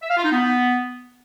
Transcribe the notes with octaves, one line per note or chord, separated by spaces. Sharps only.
E5
F5
F4
D#4
B3